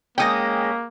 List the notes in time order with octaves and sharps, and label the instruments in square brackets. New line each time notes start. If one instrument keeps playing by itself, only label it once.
[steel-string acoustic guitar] G#3 C#4 [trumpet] A#3 [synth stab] G5 D#6 A#6